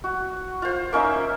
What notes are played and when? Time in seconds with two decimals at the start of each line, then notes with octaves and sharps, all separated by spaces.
0.04 F#4
0.62 F4 C5
0.93 A#3 C#4 D#4 E5